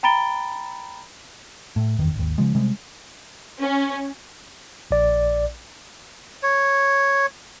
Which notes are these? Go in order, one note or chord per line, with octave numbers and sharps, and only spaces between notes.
G5 A#5 B5 A6 D7 G7
A2
F#1 E2 D#3
G#1 D#2
C#3 F3 G#3
C3 G3 G#3
C#4
A#1 D5
C#5